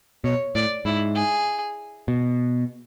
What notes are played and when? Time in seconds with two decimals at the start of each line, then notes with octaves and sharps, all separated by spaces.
0.24 B2 C#5
0.55 A2 D5
0.85 G#2 E4
1.16 G#4
2.08 B2